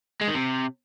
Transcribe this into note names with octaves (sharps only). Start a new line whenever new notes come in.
G#3
D#3
C3